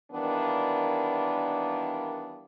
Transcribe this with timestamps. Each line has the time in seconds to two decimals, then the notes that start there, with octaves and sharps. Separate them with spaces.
0.12 D#3 E3 G3 A#3 B3 D4